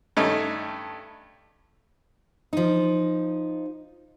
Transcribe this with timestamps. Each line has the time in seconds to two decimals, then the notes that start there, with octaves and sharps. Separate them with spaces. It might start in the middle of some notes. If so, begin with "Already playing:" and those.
0.17 G2 A3 C#4 D#4
2.53 F3 D#4